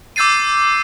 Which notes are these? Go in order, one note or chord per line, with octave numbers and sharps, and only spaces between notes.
D6 E6 G6 A6 C7 D#7